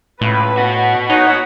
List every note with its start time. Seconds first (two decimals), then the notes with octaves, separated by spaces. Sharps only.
0.21 C#2 A2 B4
0.57 B3 F#4
1.10 D#4 C#5 F#5